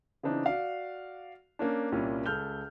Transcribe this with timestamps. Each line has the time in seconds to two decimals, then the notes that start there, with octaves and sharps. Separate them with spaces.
0.23 C#3 E3 C4 D4 D#4
0.46 F#4 D5 F5
1.59 A#3 C#4 D4
1.92 C2 A#2 G3 C#4 F4
2.26 C#2 A4 F6 G6 G7